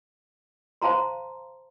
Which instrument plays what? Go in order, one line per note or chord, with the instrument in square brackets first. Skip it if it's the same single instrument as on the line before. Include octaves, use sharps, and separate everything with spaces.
[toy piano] C5 F5 A5 A#5 C6